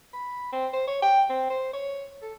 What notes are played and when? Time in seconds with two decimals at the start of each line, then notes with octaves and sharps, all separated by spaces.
0.14 B5
0.53 C4
0.73 C5
0.88 C#5
1.02 G5
1.30 C4
1.50 C5
1.73 C#5
2.22 A4